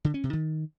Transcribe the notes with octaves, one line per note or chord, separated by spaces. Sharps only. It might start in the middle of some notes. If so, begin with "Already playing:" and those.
D3
C#4
C3
D#3